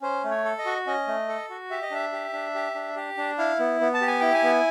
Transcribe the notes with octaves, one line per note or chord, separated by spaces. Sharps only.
C#4 C5
A3
C#5
A4
D#5
F#4
C#4 D#5
A3
A4
F#4
G4 E5
D#5
D4 E5
G4
D4
G4
D4
G4
D4
E4 F5
B3
B3
A5
G4
G#5
E4 G5
G#5
B3